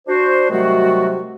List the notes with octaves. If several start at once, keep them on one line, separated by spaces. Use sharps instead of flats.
D4 F#4 C5
C3 D#3 F#3 G3 A3 F#4